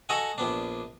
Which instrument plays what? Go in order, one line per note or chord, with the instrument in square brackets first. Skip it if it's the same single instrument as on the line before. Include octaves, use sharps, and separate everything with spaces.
[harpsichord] F#4 A4 D#5 F#5 G#5
A#1 B3 D4